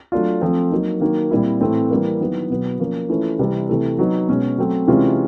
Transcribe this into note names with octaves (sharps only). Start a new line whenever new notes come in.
F#3 A3 D4 F4
F3 A3 C4
F#3 A#3 D#4
D#3 F#3 A#3
A#2 G3 C4 E4
A2 E3 A3 C4 E4
E3 G3 A#3
D#3 F#3 B3 E4
B2 F#3 B3
F3 A#3 C#4
E3 A3 C#4 F4
C3 E3 G3 C4
C3 E3 A3
F#3 B3 D#4
B2 G#3 C#4
F#3 A3 C4
C3 E3 G#3 C#4 F4